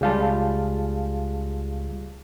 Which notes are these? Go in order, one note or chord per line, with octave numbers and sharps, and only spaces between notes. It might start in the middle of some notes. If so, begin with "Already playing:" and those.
C#2 G3 F4 G#4 F5 A5